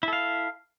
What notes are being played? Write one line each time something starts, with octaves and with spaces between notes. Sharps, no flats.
E4 A4 F5